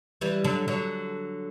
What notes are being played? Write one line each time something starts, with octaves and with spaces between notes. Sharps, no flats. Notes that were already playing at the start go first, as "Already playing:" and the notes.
E3 G3
D3 F#3
D3 F#3